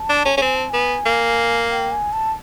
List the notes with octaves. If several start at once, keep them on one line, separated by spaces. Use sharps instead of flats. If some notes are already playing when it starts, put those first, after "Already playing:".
Already playing: A5
D4
C#4
C#4
C4 G#5
A5
B3 G#5
A#3
G5
G#5
A5